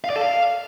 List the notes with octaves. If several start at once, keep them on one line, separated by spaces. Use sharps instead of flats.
F5
D5
A4
F5